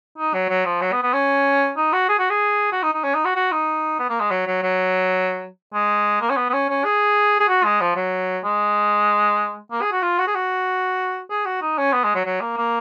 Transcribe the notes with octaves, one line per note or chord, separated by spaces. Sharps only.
D#4
F#3
F#3
F3
F#3
B3
B3
C#4
D#4
F#4
G#4
F#4
G#4
F#4
D#4
D#4
C#4
D#4
F#4
F#4
D#4
B3
A#3
G#3
F#3
F#3
F#3
G#3
A#3
C#4
B3
B3
C#4
C#4
G#4
G#4
F#4
G#3
F3
F#3
G#3
A#3
G#4
F#4
F4
F#4
G#4
F#4
G#4
F#4
D#4
C#4
B3
G#3
F#3
F#3
A#3
A#3